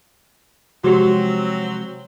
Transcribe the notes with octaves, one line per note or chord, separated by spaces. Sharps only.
C3 F3 F#3 G#3 C4 F#4 G4 C6